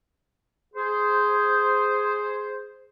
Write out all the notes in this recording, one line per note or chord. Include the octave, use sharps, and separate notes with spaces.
G#4 C5